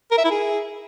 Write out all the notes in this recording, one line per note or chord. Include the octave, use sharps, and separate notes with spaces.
A#4
E5
E4
G#4